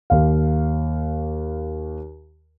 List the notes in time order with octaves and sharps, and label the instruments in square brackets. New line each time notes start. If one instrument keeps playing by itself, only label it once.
[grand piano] D#2 F5